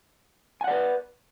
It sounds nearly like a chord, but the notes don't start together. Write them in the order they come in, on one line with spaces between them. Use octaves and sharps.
G#5 F#5 D5 B4